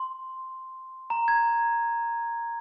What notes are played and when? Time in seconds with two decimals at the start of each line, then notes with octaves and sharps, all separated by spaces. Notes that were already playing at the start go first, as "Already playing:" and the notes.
Already playing: C6
1.10 A#5
1.28 G#6